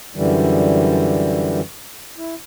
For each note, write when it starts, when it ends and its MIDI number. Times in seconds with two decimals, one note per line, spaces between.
0.15 1.61 42
0.15 1.61 50
0.15 1.61 52
0.15 1.61 55
2.17 2.35 64